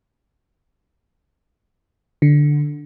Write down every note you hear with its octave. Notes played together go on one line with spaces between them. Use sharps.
D3